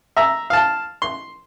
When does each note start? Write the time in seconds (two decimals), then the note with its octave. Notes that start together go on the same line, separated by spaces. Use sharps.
0.17 E5 A#5
0.50 F5 A5
1.02 C6